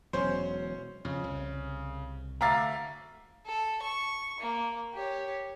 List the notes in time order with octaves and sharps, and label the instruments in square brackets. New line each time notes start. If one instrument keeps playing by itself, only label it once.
[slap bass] E1 F#3 [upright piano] C#4 C5
[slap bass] F2 [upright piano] C#3
[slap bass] C2
[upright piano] D2 E5 F5 [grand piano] A#5 D6 A6
[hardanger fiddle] A4
C#6
A#3
G4 C#5